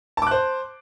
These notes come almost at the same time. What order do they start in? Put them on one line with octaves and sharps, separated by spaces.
A5 D6 F#6 C5